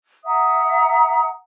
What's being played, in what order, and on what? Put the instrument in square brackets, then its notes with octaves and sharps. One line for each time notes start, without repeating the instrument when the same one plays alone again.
[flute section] E5 F#5 A#5 D#6